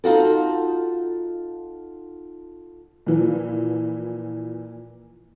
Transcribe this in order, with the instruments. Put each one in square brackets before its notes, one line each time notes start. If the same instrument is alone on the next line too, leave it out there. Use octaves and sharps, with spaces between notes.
[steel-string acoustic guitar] D#4 F4 F#4 A4
[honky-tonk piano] A#2 E3 F3